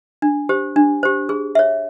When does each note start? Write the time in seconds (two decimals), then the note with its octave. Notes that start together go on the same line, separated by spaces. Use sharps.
0.22 D4
0.49 G4 C5
0.76 D4
1.03 G4 C5
1.29 G#4
1.55 C#5 E5